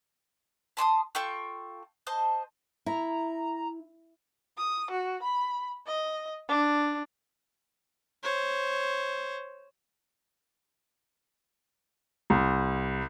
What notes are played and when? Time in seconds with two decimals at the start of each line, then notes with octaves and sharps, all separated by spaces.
0.77 A5 C6 D6 D#6
1.15 F4 A4 G5 C#6
2.07 C5 D#5 A5
2.86 E4 A#5
4.58 D#6
4.91 F#4
5.23 B5
5.87 D#5
6.49 D4
8.23 C5 C#5
12.30 C2